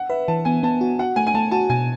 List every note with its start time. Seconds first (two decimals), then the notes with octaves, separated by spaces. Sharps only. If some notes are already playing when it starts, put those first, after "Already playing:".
Already playing: F#5
0.10 B4 E5
0.28 E3 A5
0.45 B3 G#5
0.63 B3 A5
0.81 F#4
0.99 F#4 F#5
1.16 A3 G#5
1.27 G#5
1.34 A3 A5
1.51 F#4 A5
1.70 B2 G#5